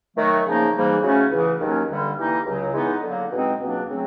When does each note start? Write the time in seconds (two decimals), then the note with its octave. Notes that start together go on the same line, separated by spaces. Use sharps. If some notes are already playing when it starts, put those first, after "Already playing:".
0.17 D#3 F#3 A3
0.45 C#3 F3 A#3 D#4
0.74 G#2 E3 G3 A#3
1.03 C#3 F#3 A3 C#4
1.31 E2 C#3 E3
1.60 D#2 D#3 F#3 A#3 C#4
1.89 G2 D3 G3
2.17 E3 G3 A#3 D#4
2.46 C#2 C#3 F#3
2.74 E3 G#3 B3 D#4
3.02 D3 F#3 A#3
3.32 E2 B2 G#3 C4 D#4
3.59 C#2 B2 F#3 A#3 D4
3.88 C#3 F#3 A3 C4